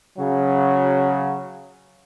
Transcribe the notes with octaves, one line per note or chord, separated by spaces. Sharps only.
C#3 F#3